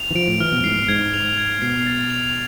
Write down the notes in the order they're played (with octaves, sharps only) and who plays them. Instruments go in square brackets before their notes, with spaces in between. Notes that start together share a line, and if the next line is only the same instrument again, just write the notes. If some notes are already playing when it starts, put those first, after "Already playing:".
Already playing: [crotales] F7
[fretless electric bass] E3
[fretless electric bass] F3 [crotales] D7
[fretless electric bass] A2
[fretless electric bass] E3 [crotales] F6
[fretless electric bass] B2
F2
[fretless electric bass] G#2 [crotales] C7
[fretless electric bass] G#2 [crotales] G#6
[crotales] F7
G#6
[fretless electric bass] B2 [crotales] C7
[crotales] A6
F7